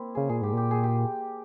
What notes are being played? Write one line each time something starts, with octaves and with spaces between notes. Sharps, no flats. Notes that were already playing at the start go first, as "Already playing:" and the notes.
Already playing: A#3 C4 E4
C#3 G#4
A#2 G#4
G#2 G4
A#2 G4
G#4
G4